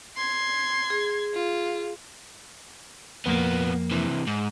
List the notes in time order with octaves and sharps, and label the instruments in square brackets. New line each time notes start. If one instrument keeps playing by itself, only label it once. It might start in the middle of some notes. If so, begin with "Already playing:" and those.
[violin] C6 G#6
[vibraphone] G#4
[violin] F4
[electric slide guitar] F2 A#3 [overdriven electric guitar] A#2 B3
[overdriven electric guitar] C3 E3
G#2